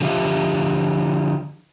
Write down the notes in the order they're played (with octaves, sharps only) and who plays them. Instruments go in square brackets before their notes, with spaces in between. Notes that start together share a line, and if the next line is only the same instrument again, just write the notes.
[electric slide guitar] D3 F3 F4 G4 E5